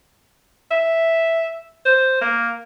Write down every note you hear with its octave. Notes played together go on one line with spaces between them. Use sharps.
E5
C5
A#3